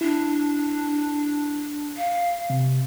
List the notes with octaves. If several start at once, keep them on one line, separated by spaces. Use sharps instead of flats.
D4 E4
F5
C3